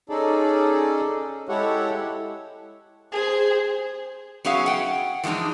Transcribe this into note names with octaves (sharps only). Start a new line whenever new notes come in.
C#4 D#4 G#4 A4 D5
G#3 E4 G4 A4 C#5 F#5
G#4 C5
F#3 B3 C#4 G#4 E5 F5
F#5 G5
E3 F3 G#3 D4 D#4